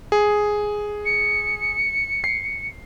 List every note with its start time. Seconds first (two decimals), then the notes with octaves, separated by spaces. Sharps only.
0.12 G#4
1.05 C#7
2.24 C7